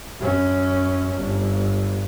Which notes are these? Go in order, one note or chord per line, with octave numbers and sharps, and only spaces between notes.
F#2 C#4
G1